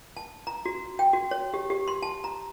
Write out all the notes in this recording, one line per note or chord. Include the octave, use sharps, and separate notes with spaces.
A5
A#5
F#4
G5
F#4
C#5
G4
G4
C6
A5
A#5